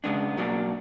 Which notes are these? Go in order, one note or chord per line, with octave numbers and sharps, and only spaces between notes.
C#3 E3 G#3 B3 D4
B2 F#3 A#3 D4